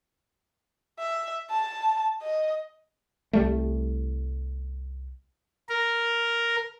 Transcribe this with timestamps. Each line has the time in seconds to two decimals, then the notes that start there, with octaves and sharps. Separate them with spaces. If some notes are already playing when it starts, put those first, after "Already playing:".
0.99 E5
1.51 A5
2.22 D#5
3.33 C2 G3 A3
5.69 A#4